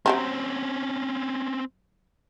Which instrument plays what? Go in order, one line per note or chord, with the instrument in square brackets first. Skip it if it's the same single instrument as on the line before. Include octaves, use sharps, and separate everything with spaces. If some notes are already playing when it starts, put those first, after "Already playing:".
[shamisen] F#3 G4 C5 [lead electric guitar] C4 C#4